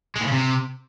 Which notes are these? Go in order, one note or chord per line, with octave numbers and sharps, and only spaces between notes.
G#3
A2
C#3
C3